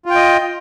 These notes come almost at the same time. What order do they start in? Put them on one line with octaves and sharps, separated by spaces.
F4 G5 D#5